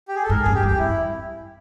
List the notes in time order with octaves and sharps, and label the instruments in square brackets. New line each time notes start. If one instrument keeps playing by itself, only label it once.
[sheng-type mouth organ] G4
G#4
A4
[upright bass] G#2 [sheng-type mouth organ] A#4
[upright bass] F#2 [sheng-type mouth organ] G#4
[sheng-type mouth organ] G4
[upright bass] G2
[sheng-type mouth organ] G4
[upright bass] F2 [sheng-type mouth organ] E4